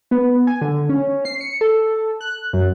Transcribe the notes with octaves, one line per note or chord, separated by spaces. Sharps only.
B3
G#5
D3
C#4
C7
C#7
A4
F#6
F#2